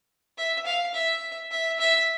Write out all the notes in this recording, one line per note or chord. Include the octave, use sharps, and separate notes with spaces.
E5
F5
E5
E5
E5